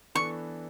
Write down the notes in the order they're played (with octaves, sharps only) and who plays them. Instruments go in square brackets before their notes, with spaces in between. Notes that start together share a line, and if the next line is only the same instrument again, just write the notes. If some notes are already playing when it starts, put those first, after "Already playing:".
[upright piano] E3 B3 D4 A4 [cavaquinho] C#6